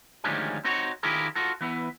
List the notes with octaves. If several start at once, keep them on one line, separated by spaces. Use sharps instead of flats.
D2 D#3 F3 G3 G#3 C#4
C4 D#4 F#4 C#5
D#3 E4 F4 G4 G#4 A#4
F4 F#4 A4
E3 B3 E4